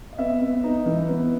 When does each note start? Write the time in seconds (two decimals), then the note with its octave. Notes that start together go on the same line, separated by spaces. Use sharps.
0.13 D#5
0.18 B3 E5
0.41 B3
0.64 D#4
0.86 E3
1.09 B3